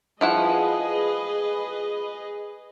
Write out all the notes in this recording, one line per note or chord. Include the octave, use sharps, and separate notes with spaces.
F3 E4 G#4 B4 D#5 F#5